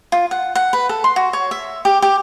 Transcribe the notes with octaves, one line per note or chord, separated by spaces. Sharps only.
F4
F#5
F#5
B4
A4
C6
F#4
C#5
E5
G4
G4